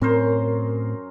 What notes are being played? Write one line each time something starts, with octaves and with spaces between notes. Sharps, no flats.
F#2 A2 C4 A#4 C5